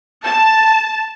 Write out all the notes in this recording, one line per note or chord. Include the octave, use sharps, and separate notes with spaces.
A5